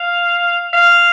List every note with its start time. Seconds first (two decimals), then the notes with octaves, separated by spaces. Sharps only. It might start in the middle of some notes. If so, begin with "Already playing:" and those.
Already playing: F5
0.73 F5